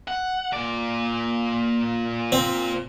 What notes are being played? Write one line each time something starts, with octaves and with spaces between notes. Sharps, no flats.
F#5
A#2 D5
C4